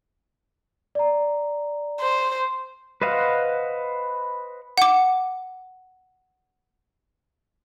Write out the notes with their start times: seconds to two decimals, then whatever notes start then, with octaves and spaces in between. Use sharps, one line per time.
0.95 D5 A#5
2.00 C5
3.02 B4 C5 D#5 F5 F#5
4.78 F#5 D6